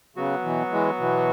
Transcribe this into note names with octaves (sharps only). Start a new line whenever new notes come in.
C#3 F#3 B3 F#4
B2 E3
E3 G#3
B2 E3